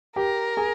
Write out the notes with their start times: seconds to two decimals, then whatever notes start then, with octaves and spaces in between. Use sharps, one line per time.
0.16 G4 A#4 G5
0.57 G#4 G#5